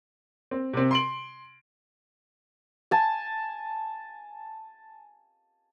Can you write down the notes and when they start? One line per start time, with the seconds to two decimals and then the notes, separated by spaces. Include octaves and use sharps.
0.51 C4
0.73 C3 C4
0.91 C6 D7 F#7
2.91 G#5 A5